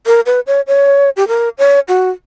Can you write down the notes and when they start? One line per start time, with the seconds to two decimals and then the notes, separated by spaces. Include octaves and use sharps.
0.06 A#4
0.26 B4
0.47 C#5
0.67 C#5
1.17 G4
1.28 A#4
1.58 C#5
1.88 F#4